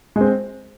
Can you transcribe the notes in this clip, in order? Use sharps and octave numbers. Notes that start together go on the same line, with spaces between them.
G#3 C4